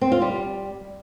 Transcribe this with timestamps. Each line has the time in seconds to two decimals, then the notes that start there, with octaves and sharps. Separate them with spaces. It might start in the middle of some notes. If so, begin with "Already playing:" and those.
0.01 C4
0.12 F4
0.22 G3